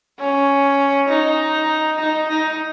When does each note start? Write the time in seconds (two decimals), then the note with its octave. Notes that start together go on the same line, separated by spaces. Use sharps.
0.20 C#4
1.09 D#4
1.99 D#4
2.29 D#4